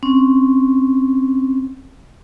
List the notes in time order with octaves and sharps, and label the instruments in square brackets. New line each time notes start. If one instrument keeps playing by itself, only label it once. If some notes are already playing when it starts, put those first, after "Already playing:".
[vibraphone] C4 C#4